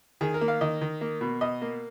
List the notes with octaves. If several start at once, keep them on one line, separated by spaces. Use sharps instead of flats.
D#3 G#4
A#4
A#3
F5
D#3 D#5
D#3
A#3
B2
B2 D#5
A#3